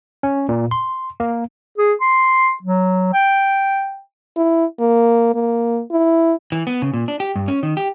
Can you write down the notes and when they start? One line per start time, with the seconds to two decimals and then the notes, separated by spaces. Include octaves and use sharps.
0.23 C#4
0.49 A#2
0.71 C6
1.20 A#3
1.78 G#4
2.01 C6
2.63 F#3
3.13 G5
4.36 E4
4.79 A#3
5.34 A#3
5.91 E4
6.52 E3
6.67 B3
6.82 C#3
6.94 A#2
7.08 D4
7.20 G4
7.36 G2
7.48 C#4
7.63 D#3
7.77 G4